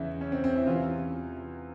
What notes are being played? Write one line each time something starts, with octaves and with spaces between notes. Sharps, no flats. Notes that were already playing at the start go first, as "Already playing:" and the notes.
Already playing: E2 C#3 E3 E4
C#4
C4
C4
E4
E2 C3 E3 F4